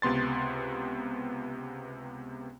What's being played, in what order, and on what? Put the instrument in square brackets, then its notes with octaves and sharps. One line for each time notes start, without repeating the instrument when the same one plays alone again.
[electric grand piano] C#2 C3 B3 C6 A6